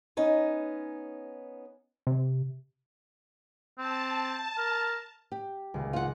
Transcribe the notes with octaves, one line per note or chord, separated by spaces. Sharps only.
B3 C#4 D#4
C3
C4 A5
A#4
G4
D#1 C#2
F4 F#5